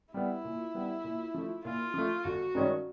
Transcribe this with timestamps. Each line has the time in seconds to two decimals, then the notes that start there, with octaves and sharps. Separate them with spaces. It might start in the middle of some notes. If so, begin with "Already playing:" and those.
0.14 G3 B3 E4
0.45 A#2
0.75 G3 B3
1.04 A#2
1.34 F3 A3
1.64 A#2 F4
1.94 F3 A3
2.24 G1 F#4
2.55 G2 D#3 G#3 C#4